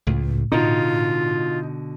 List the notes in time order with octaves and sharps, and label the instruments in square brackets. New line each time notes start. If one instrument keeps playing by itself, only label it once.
[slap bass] C#2 [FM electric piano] A2
[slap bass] B2 D3 [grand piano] D#4 [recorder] F4